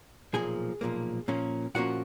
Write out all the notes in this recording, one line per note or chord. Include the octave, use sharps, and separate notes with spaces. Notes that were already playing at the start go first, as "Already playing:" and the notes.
B1 A#2 F3 A#3 G#4 G#5
B1 A#2 F3 A#3
A#2 F3 A#3 C#4
A#2 F3 A#3 C#4 F#4 F#5